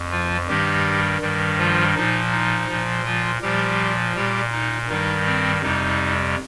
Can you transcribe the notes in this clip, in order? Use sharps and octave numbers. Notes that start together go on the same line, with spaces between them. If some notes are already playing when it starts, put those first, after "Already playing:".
Already playing: F2
F3 F4
G2 D#3 G3 G4
G2 D#3 G3
F3 F4
A#2 F3 D#4
D#4
A#2 F3
F3 F4
A#2 F3 G3 G4
A#2 G3 G4
D#4
G2 D#3 G3 D#4
C4
F2 C3 G3 D#4